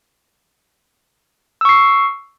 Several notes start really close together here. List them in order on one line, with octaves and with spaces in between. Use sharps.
E6 C#6 C7